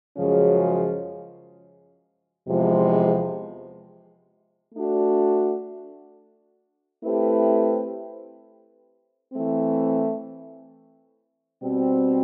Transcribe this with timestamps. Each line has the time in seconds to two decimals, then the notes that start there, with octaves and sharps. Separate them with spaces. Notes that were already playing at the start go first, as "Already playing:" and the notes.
0.16 F#2 C#3 F3 G#3 C#4
2.46 E2 C3 F3 G#3
4.74 A3 D4 F#4
7.03 A3 C4 E4 G4 B4
9.32 E3 A3 C4
11.61 B2 G3 C4